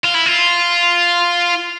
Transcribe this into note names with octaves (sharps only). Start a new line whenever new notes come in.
F4
E4
F4